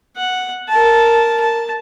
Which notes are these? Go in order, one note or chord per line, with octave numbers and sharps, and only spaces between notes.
F#5
A#4 A5
A5